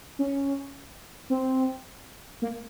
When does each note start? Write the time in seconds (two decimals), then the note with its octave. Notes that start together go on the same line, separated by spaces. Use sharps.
0.19 C#4
1.30 C4
2.42 A#3